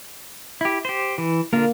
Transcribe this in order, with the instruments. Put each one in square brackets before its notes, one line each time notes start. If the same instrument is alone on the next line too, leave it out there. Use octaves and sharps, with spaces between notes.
[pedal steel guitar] E4 G4
G4 C5
E3
[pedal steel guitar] D3 F4 A#4 [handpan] A#3